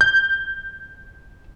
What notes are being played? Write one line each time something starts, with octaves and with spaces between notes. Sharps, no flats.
G6